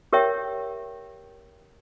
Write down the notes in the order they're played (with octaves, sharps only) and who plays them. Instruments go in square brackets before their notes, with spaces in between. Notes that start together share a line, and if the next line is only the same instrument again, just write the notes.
[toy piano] G4 A#4 C#5 E5 G5